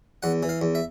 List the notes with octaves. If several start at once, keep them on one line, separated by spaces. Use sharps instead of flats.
E2 F#5
E3
F5
E2
E5